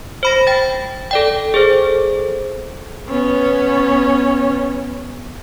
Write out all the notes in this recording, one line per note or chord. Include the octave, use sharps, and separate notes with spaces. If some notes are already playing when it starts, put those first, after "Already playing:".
C5 B5 A#6
G5 A6
A4 D5 G5
G#4 A4 C5
B3 C#4